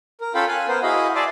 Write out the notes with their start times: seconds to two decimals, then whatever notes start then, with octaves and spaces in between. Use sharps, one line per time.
0.21 A#4
0.35 C#4 F4 A4 F5 G5 B5
0.48 F5 G#5 F#6
0.68 B3 A#4 C5
0.83 E4 F#4 G#4 D#5 F5 B5
1.15 D5 E5 G#5 A5 C6 D6